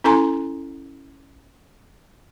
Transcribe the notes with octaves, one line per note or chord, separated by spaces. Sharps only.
C#4 E4 A4 G#5 A#5 C6